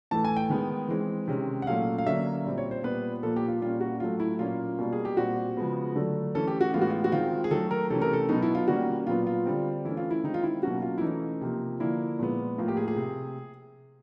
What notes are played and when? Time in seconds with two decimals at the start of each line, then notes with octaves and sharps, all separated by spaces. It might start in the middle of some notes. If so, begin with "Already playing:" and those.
0.11 A2 E3 A3 A5
0.25 G#5
0.36 G5
0.50 D#3 G#3 B3
0.88 E3 G#3 C4
1.28 C3 D#3 G#3 C#4
1.62 F#5
1.67 A#2 F#3 A3 C#4 F5
1.98 F5
2.07 D3 F#3 A#3 C#4 E5
2.45 A#2 G3 C4
2.58 C#5
2.71 C5
2.83 A#2 G3 B3 B4
3.23 A#2 F3 A#3 A4
3.36 G4
3.48 F4
3.62 A#2 G3 A#3 C#4 F4
3.81 F#4
4.00 A2 F#3 A3 F4
4.20 E4
4.39 A#2 F#3 A#3 C#4 F4
4.79 B2 G3 A#3
4.93 G#4
5.05 G4
5.17 A#2 G3 C4 F#4
5.57 C#3 F3 G#3 B3
5.96 D3 F#3 A3
6.35 E3 A3 C#4 A4
6.47 G4
6.61 F#4
6.74 A2 E3 G#3 B3 F4
6.82 F#4
6.90 F4
7.04 F#4
7.12 D#3 G#3 C4 F4
7.44 G#4
7.51 D#3 F#3 A3 A4
7.71 A#4
7.90 C3 E3 A3 C#4 A4
8.02 A#4
8.13 A4
8.29 B2 F#3 B3 D#4
8.42 E4
8.55 F4
8.68 D#3 G3 A#3 C#4 F#4
9.07 A#2 F#3 B3 F4
9.27 F4
9.46 D3 G3 C4
9.85 E3 A3 C#4 E4
9.97 F4
10.11 E4
10.24 D#3 G#3 C4 D#4
10.34 F4
10.43 E4
10.63 B2 F#3 A#3 C#4 F#4
10.82 F4
10.98 E4
11.01 E3 A3 C#4 D#4
11.41 C3 F3 A#3
11.79 D3 F3 A#3 E4
12.19 A#2 F3 G#3 B3
12.58 A2 F3 A#3 F4
12.68 G4
12.77 G#4
12.88 G#4
12.96 C3